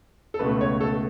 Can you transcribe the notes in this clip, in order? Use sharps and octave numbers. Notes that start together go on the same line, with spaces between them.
A4
C#2 B2 A3 B4
C#5
A4